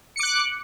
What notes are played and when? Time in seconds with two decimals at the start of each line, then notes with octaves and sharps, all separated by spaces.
0.16 C#7
0.19 D6
0.23 F#6